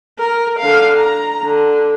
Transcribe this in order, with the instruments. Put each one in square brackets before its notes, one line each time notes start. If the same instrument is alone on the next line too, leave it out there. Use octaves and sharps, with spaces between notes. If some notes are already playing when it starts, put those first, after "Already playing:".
[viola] A#4
D3 F5
A#5
D3